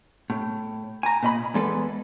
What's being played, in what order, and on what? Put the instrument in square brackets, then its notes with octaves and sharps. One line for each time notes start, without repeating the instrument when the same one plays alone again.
[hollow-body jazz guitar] A2
G#5 A#5
A#2 D#5 B5
E2 G#3 A4 B4